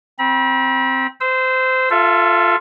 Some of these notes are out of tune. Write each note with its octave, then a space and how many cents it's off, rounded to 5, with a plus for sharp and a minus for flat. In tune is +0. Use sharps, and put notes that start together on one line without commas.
C4 +0 B5 -40
C5 -20 E6 -15
F4 +0 A4 +0 E5 +30